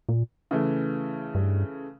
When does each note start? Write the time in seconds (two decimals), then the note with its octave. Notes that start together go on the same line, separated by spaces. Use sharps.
0.09 A#2
0.51 C#3 E3 A3
1.35 G2